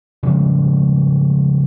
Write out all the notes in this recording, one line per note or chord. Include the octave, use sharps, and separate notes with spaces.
C#3 F3 G3 G#3